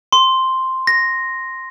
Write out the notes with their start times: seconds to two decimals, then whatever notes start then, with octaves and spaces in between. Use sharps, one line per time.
0.12 C6
0.87 A#6